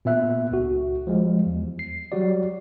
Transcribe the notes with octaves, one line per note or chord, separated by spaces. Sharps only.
A#2 B3 E5 F#6
C#2 F#4
F3 G3 G#3
E2
C7
F#3 G3 F#4 D5